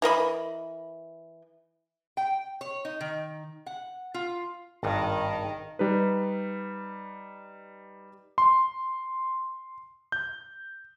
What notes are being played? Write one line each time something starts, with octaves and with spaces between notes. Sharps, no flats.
E3 A#4 D#5 B5
G5
C#5
D#4
D#3
F#5
F4
G#1 G2 D#3
G3 D#4 B4
C6
G6